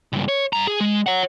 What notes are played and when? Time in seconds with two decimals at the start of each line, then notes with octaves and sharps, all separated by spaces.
0.13 C#2 G2
0.28 C#5
0.53 G2 A#5
0.67 G#4
0.81 G#3
1.06 C#5 F#5